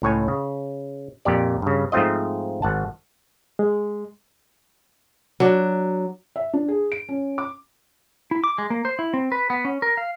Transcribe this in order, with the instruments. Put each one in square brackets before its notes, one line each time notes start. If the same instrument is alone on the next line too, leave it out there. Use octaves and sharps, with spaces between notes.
[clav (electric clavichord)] C#2 A2 C#5 G#5
C#3
F2 A#2 G4 D5
G2 C#3
G#2 F3 A3 C4 F4 D#5
G#1 F#5 A5
[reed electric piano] G#3
[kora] F#3 D4
[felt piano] E5
D4
G#4
D7
C#4
D6
[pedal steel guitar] E4
D6
G#3
A#3
C5
E4
C4
B4
B3
C#4
A#4
F5